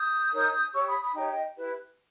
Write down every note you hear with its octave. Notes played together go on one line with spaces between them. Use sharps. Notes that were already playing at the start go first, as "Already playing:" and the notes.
Already playing: D#6 G6
D#4 A#4 C#5
G4 C#5 C#6 E6
B5 D#6
B5 D#6
D#4 G4 C#5 D#5 G5
D#5 G5
E4 G4 B4